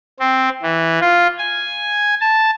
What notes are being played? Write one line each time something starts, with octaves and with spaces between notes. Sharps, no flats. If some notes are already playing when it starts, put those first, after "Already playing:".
C4
E3
F4
G#5
A5